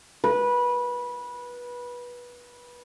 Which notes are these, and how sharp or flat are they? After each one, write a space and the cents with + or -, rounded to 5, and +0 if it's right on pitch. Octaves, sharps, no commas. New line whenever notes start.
B4 -20